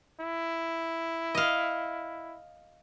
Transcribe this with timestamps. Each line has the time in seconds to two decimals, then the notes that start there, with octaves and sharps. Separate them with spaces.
0.20 E4
1.35 D#5 F5